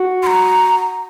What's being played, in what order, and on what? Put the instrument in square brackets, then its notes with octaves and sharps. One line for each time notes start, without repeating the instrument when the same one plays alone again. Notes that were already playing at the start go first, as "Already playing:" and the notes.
Already playing: [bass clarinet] F#4
[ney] C6
A#5